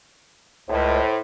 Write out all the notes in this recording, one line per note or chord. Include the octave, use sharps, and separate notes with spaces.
C#2 A2 C5